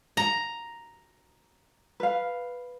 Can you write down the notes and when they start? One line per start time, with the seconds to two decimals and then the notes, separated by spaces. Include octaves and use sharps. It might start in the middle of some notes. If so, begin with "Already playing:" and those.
0.17 A#5
2.00 B4 F5